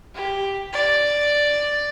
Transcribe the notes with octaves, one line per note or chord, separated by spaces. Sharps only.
G4
D5